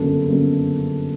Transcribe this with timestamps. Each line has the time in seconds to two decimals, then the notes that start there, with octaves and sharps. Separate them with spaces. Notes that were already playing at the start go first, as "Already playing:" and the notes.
Already playing: G1 F#2 C#3 F#3 A#3 A4
0.28 G1 F#2 C#3 F#3 A#3